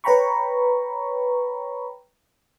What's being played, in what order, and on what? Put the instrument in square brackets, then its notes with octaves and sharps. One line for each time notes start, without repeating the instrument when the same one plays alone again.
[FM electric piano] B4 C#5 G5 A#5 B5 C#6